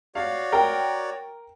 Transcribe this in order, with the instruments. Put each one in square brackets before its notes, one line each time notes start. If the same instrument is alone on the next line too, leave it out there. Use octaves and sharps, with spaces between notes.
[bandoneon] F#4 C#5 D5 [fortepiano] F5
[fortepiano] A#4 G5